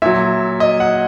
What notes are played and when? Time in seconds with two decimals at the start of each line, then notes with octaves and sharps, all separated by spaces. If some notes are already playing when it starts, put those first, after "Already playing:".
0.02 A#2 F#3 E5
0.60 D#5
0.80 F#5